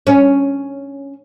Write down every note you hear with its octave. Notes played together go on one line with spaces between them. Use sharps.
C#4